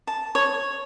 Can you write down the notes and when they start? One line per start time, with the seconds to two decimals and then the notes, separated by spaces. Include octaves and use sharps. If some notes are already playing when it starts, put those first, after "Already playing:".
0.07 A5
0.35 C#5